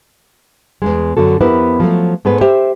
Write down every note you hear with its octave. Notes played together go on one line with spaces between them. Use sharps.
E2 G2 G#3
F#2 D3 F#4 A4
F2 B3 E4 G4 A#4 B4
F3 F#3 A3
G#2 A3 B3 G#4 B4
G4 C5 E5